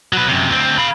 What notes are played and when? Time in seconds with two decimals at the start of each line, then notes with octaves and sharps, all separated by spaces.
0.13 F#3 B4
0.28 F#2 C3
0.49 D2 C4
0.78 F5 B5